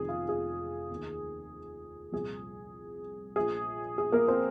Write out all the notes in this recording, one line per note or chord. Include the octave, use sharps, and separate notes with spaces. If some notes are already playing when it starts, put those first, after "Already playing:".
Already playing: F1 F2 D#3 G#4
F4
G#4
D#2 D#3
C2 A#2 F3 G#4
A#1 A#2 F3 G#4
G#4
A#3 A#4
C4 C5